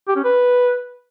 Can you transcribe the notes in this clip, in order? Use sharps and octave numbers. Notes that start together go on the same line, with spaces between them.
G4
C#4
B4